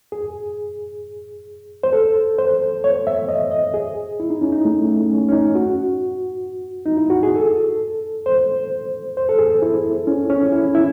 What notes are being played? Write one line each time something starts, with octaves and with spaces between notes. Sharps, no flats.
G#4
C5
A4
C5
C#5
E5
D#5
D#5
G#4
E4
D#4
C#4
D#4
A3
A3
C#4
C#4
D#4
F#4
D#4
E4
F#4
G#4
A4
C5
C5
A4
G#4
E4
C#4
C#4
E4
E4